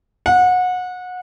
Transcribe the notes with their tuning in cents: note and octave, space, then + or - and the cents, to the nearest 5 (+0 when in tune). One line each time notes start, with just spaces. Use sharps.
F#5 -25